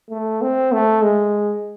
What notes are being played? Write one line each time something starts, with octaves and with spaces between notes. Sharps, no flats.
A3
C4
A3
G#3